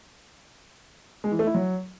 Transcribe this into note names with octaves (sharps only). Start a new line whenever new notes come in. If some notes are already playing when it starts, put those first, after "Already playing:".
G#3
E3
A3
E4
F#3